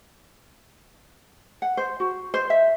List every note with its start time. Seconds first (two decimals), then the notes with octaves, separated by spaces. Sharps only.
1.62 F#5
1.77 C5
2.00 F#4
2.34 C5
2.50 E5